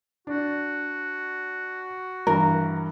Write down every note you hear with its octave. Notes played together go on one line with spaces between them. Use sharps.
D4 F#4
G2 E3 A#4